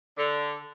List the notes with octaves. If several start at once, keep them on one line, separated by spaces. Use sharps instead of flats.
D3